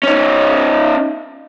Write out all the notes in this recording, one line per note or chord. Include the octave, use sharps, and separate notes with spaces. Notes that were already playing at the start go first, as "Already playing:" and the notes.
C#4 D#4